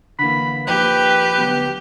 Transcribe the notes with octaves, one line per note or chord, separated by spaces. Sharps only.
D3 E3 A#3 B5
F2 A#2 D#3 G4 B4
D2 F#3 B3